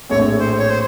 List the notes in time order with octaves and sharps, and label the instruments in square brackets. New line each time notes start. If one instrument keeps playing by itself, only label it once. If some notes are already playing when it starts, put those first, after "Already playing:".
[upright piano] A#1 A2 A3 C4 [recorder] C#5
[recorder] C5
C#5
C5